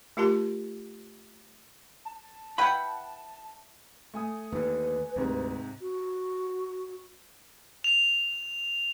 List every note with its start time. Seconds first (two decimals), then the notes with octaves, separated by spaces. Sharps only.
0.17 A3 F4 G4 A#4 A5 C6
2.05 A5
2.58 E4 B4 F#5 G5 B5
4.14 A3 G#5 D#6
4.52 D#2 D3 B4
5.16 D2 G#2 C3
5.82 F#4
7.84 F7